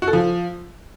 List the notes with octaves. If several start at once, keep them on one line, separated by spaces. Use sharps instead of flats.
F#4
A4
F3